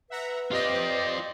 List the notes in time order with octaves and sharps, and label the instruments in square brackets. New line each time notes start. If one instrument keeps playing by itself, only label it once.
[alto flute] B4 [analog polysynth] E5 F#5 A#5
[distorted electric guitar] C4 F4 [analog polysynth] G4 C5 D5 [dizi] D#5